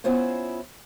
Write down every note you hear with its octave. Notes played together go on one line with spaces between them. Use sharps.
B3 C#4 E4 F4 C5 C#5